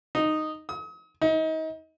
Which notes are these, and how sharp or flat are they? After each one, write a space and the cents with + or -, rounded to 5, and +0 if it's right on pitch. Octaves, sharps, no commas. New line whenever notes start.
D#4 -5
D#6 +40
D#4 +35